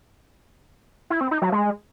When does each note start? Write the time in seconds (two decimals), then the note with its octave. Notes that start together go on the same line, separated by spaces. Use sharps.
1.10 E4
1.21 C4
1.31 D#4
1.42 F#3
1.52 G#3